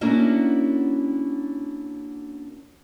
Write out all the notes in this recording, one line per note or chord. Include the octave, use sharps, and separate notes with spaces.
A#3 C#4 D4 E4 F#4